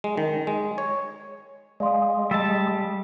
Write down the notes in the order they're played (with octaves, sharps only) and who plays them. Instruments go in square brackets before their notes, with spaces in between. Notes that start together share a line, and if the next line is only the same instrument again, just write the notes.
[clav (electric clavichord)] G#3
D#3
G#3
C#5
[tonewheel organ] G#3 [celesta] D5 F5 C6
[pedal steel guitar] G3 A5 [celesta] E6 A6 E7